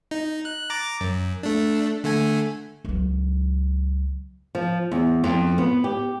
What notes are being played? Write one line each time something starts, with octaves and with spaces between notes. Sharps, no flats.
D#4
F#6
A#5 D6 A6
F#2
A3 D4
D3 A3 G#5
C#2 F#3
F3
E2
F2
B3
G4